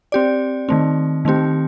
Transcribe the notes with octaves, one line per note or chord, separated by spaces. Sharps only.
C4 G4 D5
D#3 A3 C4
D#3 A3 C4 G4